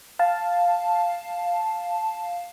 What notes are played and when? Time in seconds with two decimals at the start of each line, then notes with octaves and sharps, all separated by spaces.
0.19 F5 A5